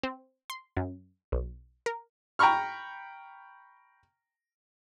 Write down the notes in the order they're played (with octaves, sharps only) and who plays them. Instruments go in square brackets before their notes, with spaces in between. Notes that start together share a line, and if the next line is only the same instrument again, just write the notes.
[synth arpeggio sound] C4
C6
F#2
B1
A#4
[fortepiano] G5 A#5 B5 C#6 F6